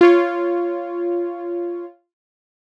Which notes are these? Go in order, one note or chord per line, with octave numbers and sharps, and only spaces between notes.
F4 C#5